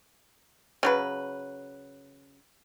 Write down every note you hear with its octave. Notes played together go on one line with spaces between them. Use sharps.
C#3 F#3 B4